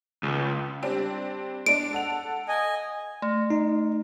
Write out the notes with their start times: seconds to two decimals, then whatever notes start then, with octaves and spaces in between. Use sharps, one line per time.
0.23 C#2
0.82 G3 C4 D4
1.66 G#3 D4 D5 D7
1.93 A4 F#5 F7
2.48 D#5 G#5
3.22 A3
3.50 D#4